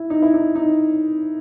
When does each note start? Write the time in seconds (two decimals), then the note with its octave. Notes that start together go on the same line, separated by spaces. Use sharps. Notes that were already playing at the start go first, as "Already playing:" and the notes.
Already playing: E4
0.10 D#4
0.22 E4
0.34 D#4
0.55 D#4